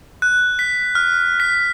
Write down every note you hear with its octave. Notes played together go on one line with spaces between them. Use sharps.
F#6
B6
F6
B6